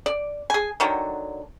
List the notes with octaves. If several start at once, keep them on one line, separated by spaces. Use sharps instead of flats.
D5
G#4 G#5
D3 D#3 F#3